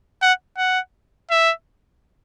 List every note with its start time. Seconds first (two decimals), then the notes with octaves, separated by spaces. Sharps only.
0.22 F#5
0.58 F#5
1.31 E5